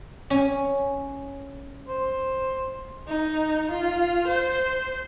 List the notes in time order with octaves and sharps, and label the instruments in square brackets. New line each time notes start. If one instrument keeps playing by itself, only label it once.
[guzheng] C#4
[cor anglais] C5
[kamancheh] D#4
F4
C5